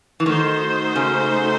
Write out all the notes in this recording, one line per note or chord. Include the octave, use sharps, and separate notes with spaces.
E3
D#3 A3 D#4 F#4 C5
C#3